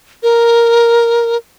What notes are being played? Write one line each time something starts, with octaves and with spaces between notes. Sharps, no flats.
A#4